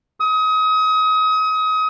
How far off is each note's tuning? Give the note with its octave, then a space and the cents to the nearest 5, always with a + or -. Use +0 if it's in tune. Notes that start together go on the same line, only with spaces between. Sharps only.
D#6 +30